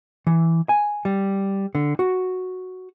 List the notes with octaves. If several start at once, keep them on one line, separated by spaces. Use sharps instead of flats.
E3
G#5
G3
D3
F#4